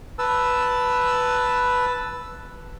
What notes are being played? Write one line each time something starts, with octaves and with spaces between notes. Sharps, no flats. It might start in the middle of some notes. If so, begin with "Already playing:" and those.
B4 A5 E6